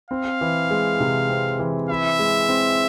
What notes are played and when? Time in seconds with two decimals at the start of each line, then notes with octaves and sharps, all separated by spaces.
0.11 C4 F5
0.41 E3
0.70 G#3
1.00 C3
1.30 C4
1.59 E3
1.89 E4 E5
2.19 G#3
2.49 C4